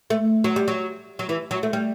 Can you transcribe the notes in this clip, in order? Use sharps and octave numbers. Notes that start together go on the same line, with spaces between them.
A3
F#3
G3
F#3
F#3
E3
F#3
A3
G3